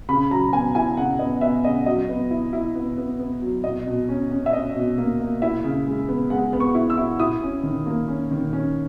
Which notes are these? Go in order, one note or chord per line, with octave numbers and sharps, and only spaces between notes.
C#3 B5
F#3 A#5
B3 G#5
E4 G#5
C#3 F#5
B3 D#5
B3 E5
C#3 D#5
F#3 D#5
B3
E4
E4
B3
B3
B3
F#3
B2 D#5
B2
C#4
C#4
E5
C#4 D#5
B2
A#3
A#3
E4 E5
C#3
G#3
B3
G#3 F#5
B3
C#6
E4
E6
E4
E4 D#6
C#4
D#3
A#3
C#4
D#3
C#4